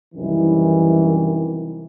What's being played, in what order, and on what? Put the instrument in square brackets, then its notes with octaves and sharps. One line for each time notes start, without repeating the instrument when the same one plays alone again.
[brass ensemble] C2 F#2 D#3 E3